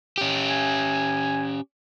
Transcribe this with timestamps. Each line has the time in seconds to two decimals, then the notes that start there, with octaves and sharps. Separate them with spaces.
0.18 C#4 G4
0.49 G#5